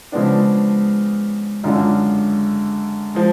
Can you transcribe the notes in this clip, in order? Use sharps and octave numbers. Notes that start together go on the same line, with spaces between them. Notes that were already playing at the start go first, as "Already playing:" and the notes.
C#3 F3 G#3 B3 D4
F#2 D3 G#3 D4 F4
F3 G#3